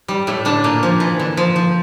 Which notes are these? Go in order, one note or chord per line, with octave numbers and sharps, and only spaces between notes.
G3
A2 A3
D3 D4
A#2 A#3
F3
E3
D3
F3
F3